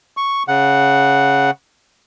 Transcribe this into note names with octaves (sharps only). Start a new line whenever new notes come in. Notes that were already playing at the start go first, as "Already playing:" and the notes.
C#6
C#3 F#5